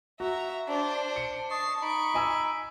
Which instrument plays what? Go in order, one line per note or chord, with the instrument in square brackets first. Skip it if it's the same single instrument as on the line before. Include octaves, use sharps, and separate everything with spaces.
[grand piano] F#4 [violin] E5 A#5
[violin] D4 C5
[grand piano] C#7
[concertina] D#5 A5 C#6 [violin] C7
[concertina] D#4 B5 [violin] C#6 D7
[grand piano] D#5 G#5 E6